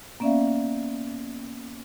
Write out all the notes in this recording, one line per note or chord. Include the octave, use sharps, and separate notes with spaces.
A#3 B3 C#4 D5 E5 F5